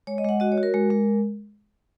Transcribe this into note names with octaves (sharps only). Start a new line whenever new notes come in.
G#3 C#5
D#5
G#3 F#5
F#4 D#5
C#5
F#4
A#4
G#3
G#3